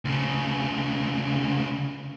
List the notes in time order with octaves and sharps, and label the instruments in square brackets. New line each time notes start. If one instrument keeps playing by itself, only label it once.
[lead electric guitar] D2 C#3